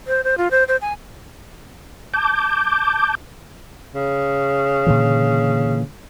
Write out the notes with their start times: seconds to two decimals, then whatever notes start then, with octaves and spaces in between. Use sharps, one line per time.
0.07 C5
0.24 C5
0.38 F4
0.51 C5
0.68 C5
0.81 G#5
2.14 A5 D6 G6
3.94 C#3
4.86 A#2 D3 E3